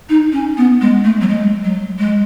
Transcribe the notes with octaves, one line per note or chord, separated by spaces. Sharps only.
D#4
C#4
B3
G#3
A3
F#3
G#3
F#3
G#3